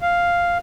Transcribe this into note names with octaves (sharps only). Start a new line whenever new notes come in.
F5